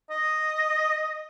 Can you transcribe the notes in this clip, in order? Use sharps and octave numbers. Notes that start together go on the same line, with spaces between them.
D#5